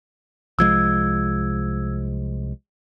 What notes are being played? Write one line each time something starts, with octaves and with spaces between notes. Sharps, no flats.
C2 F3 G#3 E6 G#6